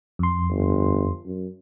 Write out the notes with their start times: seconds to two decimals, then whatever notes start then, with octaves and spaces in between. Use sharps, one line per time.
0.19 F2 C6
0.50 G1
1.26 F#2